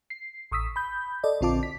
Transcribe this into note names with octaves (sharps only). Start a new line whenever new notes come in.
C7
A1 C#6 D#6 E6 B6
B5 G6
A4 D5 D#5
A#1 D3 C4 F4 A5 D6
B6